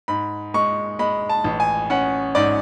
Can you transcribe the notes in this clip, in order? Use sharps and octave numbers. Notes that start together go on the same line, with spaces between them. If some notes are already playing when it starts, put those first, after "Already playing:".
G#2 B5
G#3 C#6
G#3 B5
A5
A1
G#5
C#4 F#5
G#2 D5